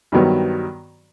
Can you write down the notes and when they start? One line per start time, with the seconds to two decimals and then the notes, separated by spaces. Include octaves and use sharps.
0.12 G2 D#3 F#3 B3